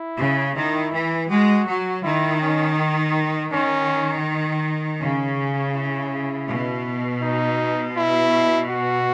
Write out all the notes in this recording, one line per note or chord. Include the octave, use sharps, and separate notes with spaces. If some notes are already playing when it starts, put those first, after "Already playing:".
Already playing: E4
C#3
D#3 E4
E3
G#3 F#4
F#3
D#3 E4
C#4
D#3 C#4
C#3 C#4
E4
B2
D#4
E4
F#4